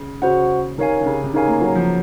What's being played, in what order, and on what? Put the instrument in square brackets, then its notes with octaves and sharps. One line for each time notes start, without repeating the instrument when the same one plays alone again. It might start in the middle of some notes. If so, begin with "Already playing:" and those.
Already playing: [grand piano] C#3
[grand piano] C#3 [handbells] F#4 C5 F#5
[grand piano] C3 [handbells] D#4 A#4 C#5 F5 G#5
[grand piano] C3
C#3
C3
[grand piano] C#3 [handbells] D#4 A#4 C#5 F5 G#5
[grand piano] A#3
F#3
F3